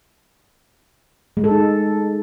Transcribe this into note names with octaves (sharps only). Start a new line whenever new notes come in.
G#3
A4
D#4